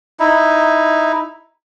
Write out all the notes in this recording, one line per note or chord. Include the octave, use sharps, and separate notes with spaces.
D#4 E4